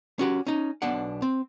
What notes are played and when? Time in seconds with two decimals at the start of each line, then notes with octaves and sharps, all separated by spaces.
0.19 C#4 F#4 G4
0.47 C#4 D#4
0.82 B1 B2 D4 F#5
1.22 C4